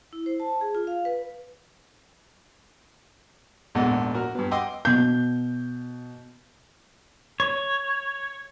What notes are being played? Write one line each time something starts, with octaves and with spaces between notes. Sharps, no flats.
E4
C5
A5
G#4
F4
F5
B4
A#1 E2 G#2 A4 D#5 F#5
F#4 A#4
G2 B3
D#5 F#5 G5 C6 D6 E6
B2 G6
C#5